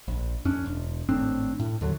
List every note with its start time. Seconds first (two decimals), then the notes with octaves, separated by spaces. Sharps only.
0.08 A#1
0.45 F2 C#4 D4
0.66 E1
1.09 G#1 A2 C4 D4
1.60 A2
1.81 D#2 D3 F#3